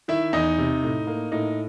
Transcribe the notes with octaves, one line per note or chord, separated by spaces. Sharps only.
D#3 E4 E5
E2 D#4 D#5
C3
A2
A#3
A2 D#4 D#5